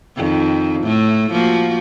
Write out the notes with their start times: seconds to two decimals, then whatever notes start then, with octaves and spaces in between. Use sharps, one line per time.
0.16 F2 D#3
0.83 A2 A3
1.31 F3 A#3 F#4